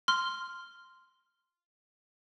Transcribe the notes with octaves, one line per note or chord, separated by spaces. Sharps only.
C6 F6 G7